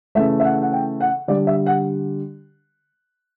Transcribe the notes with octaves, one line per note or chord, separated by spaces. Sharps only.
C#3 E3 A3 E5
E5
F#5
F#5
G5
F#5
D3 G3 D5
E5
F#5